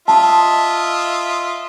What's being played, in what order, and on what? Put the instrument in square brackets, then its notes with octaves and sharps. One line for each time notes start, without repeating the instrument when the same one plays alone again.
[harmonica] F4 D#5 E5 [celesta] A5